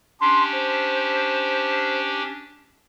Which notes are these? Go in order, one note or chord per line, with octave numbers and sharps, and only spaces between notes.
C#4 D4 G4 C6
C5